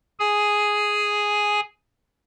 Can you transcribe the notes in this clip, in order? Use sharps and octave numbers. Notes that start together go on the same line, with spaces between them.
G#4 G#5